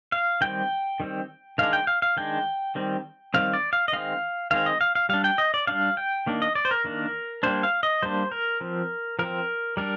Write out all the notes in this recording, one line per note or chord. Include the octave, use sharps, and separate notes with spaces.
F5
D#3 G3 C4 G5
D#3 G3 C4
D#3 G#3 D4 F5
G5
F5
F5
D#3 G#3 D4 G5
D#3 G3 C4
D#3 G3 C4 F5
D5
F5
D#5
D#3 G#3 C4 F5
D#3 G#3 C4 F5
D#5
F5
F5
G3 D4 F5
G5
D#5
D5
G3 D4 F5
G5
D#3 A#3 D4
D#5
D5
C5
A#4
D#3 A#3 D4
G3 A#3 D4 C5
F5
D#5
G3 A#3 D4 C5
A#4
F3 C4
F3 C4 A#4
G3 D4 A#4